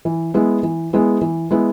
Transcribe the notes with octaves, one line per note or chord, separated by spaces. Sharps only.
E3
G#3 B3 E4
E3
G#3 B3 E4
E3
G#3 B3 E4